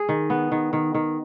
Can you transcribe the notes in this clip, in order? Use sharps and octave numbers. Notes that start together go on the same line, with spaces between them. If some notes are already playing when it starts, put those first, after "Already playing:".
Already playing: G#4
D#3
B3
D#3
D#3
D#3